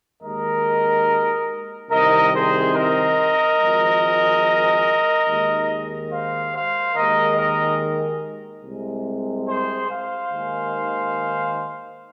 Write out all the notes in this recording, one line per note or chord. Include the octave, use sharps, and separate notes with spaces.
D#2 D#3 G#3 A#4 D#5
C2 C3 D#3 A#4 D#5
G#4 C5
A#4 D#5
G#1 G#2 F3 G#3
D#2 D#3 G#3
C5 F5
C5 F5
D#2 D#3 G#3 A#4 D#5
A#4 D#5
C2 C3 G#3
G#4 C5
C5 F5
D#2 D#3 G#3